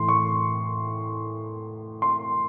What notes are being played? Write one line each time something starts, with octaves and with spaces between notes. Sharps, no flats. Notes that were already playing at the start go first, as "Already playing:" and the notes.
Already playing: A2 E3 C6
C#6
C6